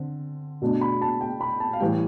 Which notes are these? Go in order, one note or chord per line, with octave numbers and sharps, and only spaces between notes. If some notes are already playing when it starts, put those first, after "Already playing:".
Already playing: D3 C4
B2 A3 D4
B5
A5
G5
B5
A5
F5
A2 E3 G3 G5